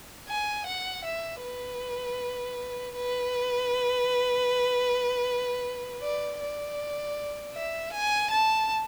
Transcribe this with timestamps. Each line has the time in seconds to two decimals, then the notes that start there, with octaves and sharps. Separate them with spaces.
0.28 G#5
0.66 F#5
1.04 E5
1.43 B4
2.96 B4
6.02 D5
6.40 D5
7.54 E5
7.93 G#5
8.31 A5